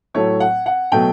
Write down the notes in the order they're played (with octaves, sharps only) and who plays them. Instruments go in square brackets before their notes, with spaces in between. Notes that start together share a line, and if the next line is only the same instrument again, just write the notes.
[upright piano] A2 F#3 A3 C#5
F#5
F#5
B2 F#3 A3 G5